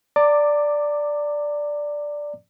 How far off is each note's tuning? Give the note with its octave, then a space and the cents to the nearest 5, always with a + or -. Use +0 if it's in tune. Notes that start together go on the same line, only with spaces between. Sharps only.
D5 +0 A#5 -35 D6 +10